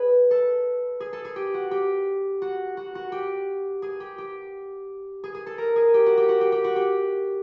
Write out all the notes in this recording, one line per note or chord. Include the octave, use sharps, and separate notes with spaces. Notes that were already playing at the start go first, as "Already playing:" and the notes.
Already playing: G#4 B4
A4
G#4
A4
G#4
G4
F#4
G4
F#4
F#4
F#4
G4
G#4
G4
G4
G#4
G#4
A4
A#4
G#4
G4
F#4
G4
F#4
G4
G4
F#4
G4